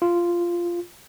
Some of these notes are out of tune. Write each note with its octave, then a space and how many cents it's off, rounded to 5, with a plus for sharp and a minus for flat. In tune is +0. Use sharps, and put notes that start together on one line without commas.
F4 -10